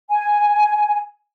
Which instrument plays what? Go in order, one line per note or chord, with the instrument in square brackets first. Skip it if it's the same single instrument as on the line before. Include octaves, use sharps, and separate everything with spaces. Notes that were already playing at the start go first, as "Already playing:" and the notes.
[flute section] G#5